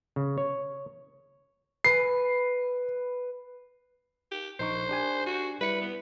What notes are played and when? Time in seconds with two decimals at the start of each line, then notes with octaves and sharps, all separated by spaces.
0.16 C#3
0.38 C#5
1.85 B4 C7
4.32 G4
4.59 A#1 D#4 C5 C#6
4.89 D4 G4 G#5
5.26 F#4
5.61 G3 E4 B4 C#7
5.81 B3